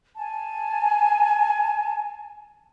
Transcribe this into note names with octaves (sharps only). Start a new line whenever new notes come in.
G#5 A5